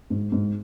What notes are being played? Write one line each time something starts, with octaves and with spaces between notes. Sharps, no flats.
G#2
G#2